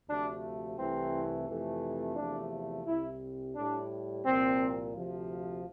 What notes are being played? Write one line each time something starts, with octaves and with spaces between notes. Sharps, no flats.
D2 C3 F3 A3 D4
C2 C3 E3 A3 C4
F2 C3 E3 A3
E2 C3 F3 A3 D4
C2 C3 G3 E4
A2 G3 D4
C2 A#2 F3 C4
D2 C3 F3